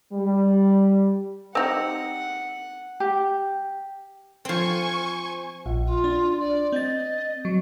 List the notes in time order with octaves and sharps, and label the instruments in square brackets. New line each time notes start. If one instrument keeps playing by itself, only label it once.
[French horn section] G3
[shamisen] C4 D#4 G4 [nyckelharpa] F#5
[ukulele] G4
[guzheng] F3 C4 [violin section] C5 G#5 C#6
[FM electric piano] A#1
[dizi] F4
[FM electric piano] D4
[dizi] D5
[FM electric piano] C4 A6 [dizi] D#5
[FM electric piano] F#3